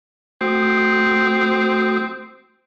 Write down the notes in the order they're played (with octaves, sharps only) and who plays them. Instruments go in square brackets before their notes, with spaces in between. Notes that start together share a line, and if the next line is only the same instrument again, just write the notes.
[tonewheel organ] A3 F#4 D#6 [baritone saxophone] C4